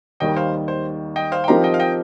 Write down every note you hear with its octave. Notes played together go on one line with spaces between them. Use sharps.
D#2 D#3 G3 D#5 G5
C5 F5
C5
D#5 G5
C5 F5
G5
F3 C4 D#4 G4 A#4 F5 A#5
D#5 G5
F5
D#5 G5